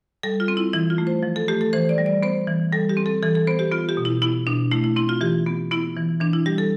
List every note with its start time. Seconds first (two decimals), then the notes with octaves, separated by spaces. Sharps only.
0.23 G3 A4
0.40 F4
0.48 C4
0.57 E4
0.73 E3 E4
0.90 F4
0.98 A3
1.07 C5
1.23 F3
1.36 A4
1.48 A3 G4
1.61 A4
1.73 E3 C5
1.89 D5
1.98 G3
2.06 D5
2.23 B3 C5
2.47 E3
2.72 G3 A4
2.89 G4
2.97 C4
3.06 A4
3.23 E3 A4
3.35 A4
3.47 B3 C5
3.59 G4
3.72 B3 F4
3.89 G4
3.97 B2
4.05 E4
4.22 B3 E4
4.47 B2 D4
4.72 A3 E4
4.84 E4
4.96 C4 E4
5.09 F4
5.21 E3 G4
5.46 B3
5.71 B3 E4
5.97 E3
6.20 E3 D4
6.33 E4
6.46 G3 G4
6.58 A4